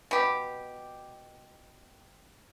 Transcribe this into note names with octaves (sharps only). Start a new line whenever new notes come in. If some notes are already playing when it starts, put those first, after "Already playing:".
B2 G4